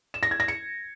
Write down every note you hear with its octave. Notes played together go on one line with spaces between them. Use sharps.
E7
A#6
G#6
A#6
C#7